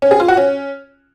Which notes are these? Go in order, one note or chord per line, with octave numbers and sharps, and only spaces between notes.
C#4
G#4
F4
F#4
C#4